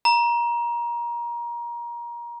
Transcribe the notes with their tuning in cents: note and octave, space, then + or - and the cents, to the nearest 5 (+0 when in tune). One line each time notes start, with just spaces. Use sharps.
A#5 +25